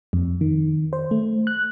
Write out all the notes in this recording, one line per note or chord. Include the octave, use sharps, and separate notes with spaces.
F2
D#3
C5
A3
F#6